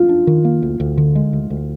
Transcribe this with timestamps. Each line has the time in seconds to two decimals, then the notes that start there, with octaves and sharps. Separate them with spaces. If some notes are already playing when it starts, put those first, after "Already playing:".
Already playing: F4
0.09 D4
0.27 D#3
0.45 A#3
0.62 D2
0.80 D2
0.98 D3
1.15 G#3
1.33 D2
1.50 D2